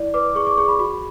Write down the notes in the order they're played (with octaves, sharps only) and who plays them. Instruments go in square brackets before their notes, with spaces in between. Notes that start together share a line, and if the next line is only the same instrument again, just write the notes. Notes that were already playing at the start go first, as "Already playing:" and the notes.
Already playing: [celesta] E4 D5
B4 D6
G#4 C#6
D6
G#4 C#6
B5
F#4 B5